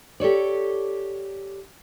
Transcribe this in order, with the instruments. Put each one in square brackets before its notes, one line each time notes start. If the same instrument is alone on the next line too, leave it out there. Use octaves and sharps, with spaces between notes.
[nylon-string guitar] G4 A4 C#5 D5